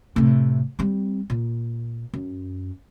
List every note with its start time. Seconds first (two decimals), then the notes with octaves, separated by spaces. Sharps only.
0.16 A2 C3
0.79 G3 C4
1.30 A#2
2.14 F#2